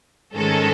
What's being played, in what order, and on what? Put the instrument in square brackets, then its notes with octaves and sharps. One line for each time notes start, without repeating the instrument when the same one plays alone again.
[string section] G#2 D#3 G#3 C#4 A4